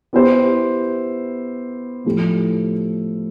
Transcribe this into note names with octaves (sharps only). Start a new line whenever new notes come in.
B3 E4 G4 C5
A2 F3 A3 E4 G4